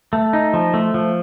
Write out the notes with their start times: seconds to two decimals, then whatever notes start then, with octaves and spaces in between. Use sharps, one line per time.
0.13 A3
0.33 D#4
0.54 F3
0.74 A3
0.94 F3